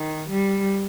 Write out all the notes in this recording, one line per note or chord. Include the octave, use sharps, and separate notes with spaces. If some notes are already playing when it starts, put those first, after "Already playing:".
Already playing: D#3
G3